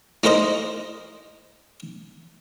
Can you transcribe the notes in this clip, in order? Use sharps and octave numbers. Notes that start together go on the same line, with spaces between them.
D#4 E4 A#4 C5 D#5